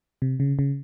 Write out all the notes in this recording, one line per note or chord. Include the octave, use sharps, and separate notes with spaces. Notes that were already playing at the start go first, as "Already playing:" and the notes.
C3
C#3
C#3